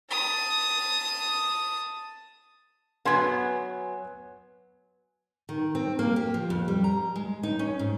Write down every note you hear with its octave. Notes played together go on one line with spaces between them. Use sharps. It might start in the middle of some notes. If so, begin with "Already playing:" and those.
A5 D#6
F#3 B3 G#5 C6 G#6
D#3
C4
A#3
G4
F3
F2
G3
A#5
G#3
D#4
C#4
G#2